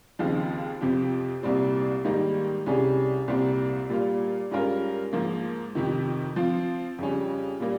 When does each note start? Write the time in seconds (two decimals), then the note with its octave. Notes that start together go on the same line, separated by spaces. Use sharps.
0.19 D#2 C#3 F3 C4 D#4
0.81 F2 C3 F3 C4 G4
1.43 C2 A#2 G3 C4
2.05 G#2 D#3 G3 A#3 D#4
2.66 C2 C3 G3 C#4 G#4
3.28 C2 A#2 G3 C4
3.89 A#2 G3 A#3 F4
4.51 G#2 G3 C#4 F4 A#4
5.13 G#2 F3 A#3
5.75 F2 C3 D#3
6.36 F3 C4 F4
6.98 F2 C#3 G3 C#4
7.60 A#2 G3 A#3